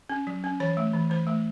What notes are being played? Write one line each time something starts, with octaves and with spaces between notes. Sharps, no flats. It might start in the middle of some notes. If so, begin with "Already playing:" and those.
C#4
F#3
C#4
E3 C#5
A3
E3
E3 C5
A3